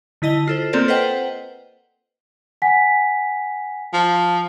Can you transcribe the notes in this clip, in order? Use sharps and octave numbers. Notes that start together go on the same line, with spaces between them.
D3 E4 D#5 A5 G7
F4 A4 C5
A#3 C4 F4 A4 A#4 D5
B4 C5 D#5 F#5 G5
F#5 G#5 B6
F3